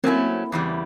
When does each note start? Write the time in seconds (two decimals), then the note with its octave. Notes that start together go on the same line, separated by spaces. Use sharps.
0.04 F#3 A3 A#3 C4 C#4 E4
0.52 E2 C#3 E3 G3